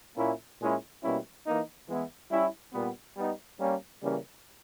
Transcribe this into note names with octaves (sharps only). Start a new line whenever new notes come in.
A#2 A#3 C#4 E4
A#2 G#3 C#4 E4
B2 G3 A#3 C#4 E4
E3 A#3 D#4
E3 G#3 B3 E4
G3 C#4 E4
A#2 G3 B3
G3 B3 D#4
G3 A#3 C#4
C#3 E3 G3 A#3 C#4